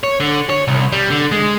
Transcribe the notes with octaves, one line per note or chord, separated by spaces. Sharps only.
C#5
D3
C#5
C2
G3
D3
G#3